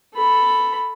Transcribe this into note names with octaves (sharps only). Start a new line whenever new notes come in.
A4 B5